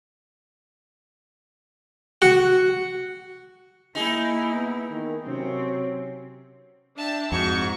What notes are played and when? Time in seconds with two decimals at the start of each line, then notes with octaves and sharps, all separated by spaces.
2.22 F#4
3.95 A#3 D#4 E4 G#4
4.52 B3
4.90 D#3
5.25 C3 F#3 C4 C#4
6.98 D4 E5 G5 A5
7.32 F2 G#2 F#4 C#6